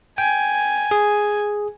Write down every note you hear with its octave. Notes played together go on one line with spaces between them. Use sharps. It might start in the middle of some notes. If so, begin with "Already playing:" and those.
G5 G#5
G#4